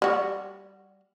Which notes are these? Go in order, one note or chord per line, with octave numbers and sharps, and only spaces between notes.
G3 F#4